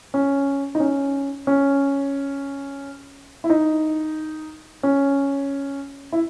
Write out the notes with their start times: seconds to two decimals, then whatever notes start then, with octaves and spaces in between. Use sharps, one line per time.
0.14 C#4
0.75 D#4
0.80 C#4
1.47 C#4
3.44 E4
3.50 D#4
4.83 C#4
6.12 E4